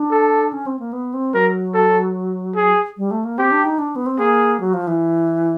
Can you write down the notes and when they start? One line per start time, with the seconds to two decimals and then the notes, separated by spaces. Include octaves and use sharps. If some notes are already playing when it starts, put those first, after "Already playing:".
Already playing: D4
0.11 A4
0.53 C#4
0.66 C4
0.79 A#3
0.93 B3
1.14 C4
1.34 F#3 A#4
1.74 A4
2.56 G#4
2.98 G3
3.11 A3
3.24 A#3
3.38 C4 G4
3.51 D4
3.65 D#4
3.79 D4
3.96 B3
4.06 C4
4.19 A#3 G#4
4.60 F#3
4.74 F3
4.87 E3